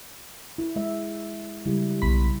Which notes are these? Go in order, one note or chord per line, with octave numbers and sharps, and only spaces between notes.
E4
G#3 E5
C#3 G3 E4
B1 B5